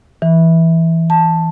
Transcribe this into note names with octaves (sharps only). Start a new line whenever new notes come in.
E3
A5